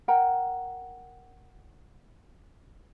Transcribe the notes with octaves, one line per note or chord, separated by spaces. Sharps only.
A#4 F#5 G5 A#5